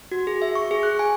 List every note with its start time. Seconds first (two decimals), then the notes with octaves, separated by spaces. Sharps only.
0.11 F#4
0.27 G#4
0.42 E5
0.55 C#6
0.71 G#4
0.83 F#6
0.99 G#5